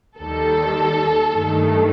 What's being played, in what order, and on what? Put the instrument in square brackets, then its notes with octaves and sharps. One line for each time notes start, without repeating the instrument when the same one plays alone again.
[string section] D#2 D#3 G3 A4
G2 D#3 A3